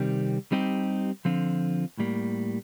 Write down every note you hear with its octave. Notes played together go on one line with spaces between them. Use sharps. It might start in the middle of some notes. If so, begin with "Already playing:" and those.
Already playing: C3 D#3 G3 C4
G3 C4 D#4 G4
D3 F3 C4 F4
A2 G3 A#3